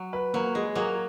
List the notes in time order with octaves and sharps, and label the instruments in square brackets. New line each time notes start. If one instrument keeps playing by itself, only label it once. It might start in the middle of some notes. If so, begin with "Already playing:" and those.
Already playing: [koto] F#3
[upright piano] B4
[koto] F#3 [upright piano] A#3
[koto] G#3 [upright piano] G#4
[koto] F#3 A#3 [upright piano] G#4